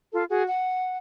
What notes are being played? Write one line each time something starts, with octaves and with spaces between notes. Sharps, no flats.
F4 A4
F#4 G#4
F#5